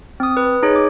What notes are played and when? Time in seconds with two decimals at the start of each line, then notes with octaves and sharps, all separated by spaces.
0.20 C4 D#6
0.37 B4
0.63 D#4 G#4 C#5
0.76 D6